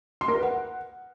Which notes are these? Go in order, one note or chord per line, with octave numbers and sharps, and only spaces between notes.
C6
A#4
B4
F#5